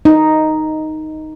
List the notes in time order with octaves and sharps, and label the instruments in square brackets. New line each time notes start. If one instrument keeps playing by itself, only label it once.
[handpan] D#4